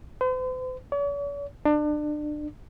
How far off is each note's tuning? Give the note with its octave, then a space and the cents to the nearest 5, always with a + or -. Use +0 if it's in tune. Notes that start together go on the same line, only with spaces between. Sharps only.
C5 -45
C#5 +45
D4 +30